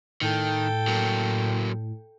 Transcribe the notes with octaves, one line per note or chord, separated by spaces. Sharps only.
A2 D#3 A4 G5
F#3 A#3